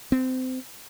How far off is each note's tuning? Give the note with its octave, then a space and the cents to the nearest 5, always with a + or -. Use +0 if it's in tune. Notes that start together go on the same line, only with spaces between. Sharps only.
C4 -25